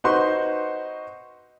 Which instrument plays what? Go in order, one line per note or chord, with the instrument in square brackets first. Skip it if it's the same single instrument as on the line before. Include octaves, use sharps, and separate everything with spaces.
[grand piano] D#4 F#4 B4 C5 C6 C#6